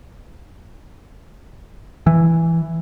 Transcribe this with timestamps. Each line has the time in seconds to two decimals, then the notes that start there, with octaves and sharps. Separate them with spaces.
2.07 E3